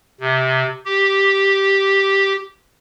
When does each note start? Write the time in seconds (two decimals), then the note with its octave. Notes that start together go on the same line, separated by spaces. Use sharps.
0.20 C3
0.86 G4